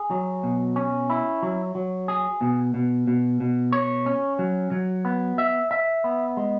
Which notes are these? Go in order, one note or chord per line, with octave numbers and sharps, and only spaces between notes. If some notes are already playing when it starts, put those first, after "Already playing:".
Already playing: G#4
F#3
B2
C#4
E4
F#3
F#3
G#4
B2
B2
B2
B2
C#5
C#4
F#3
F#3
B3
E5
E5
B3
G#3